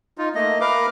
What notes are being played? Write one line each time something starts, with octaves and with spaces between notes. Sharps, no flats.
D#4 F4
A3 A#3 D#5
A#4 B4 F5 D6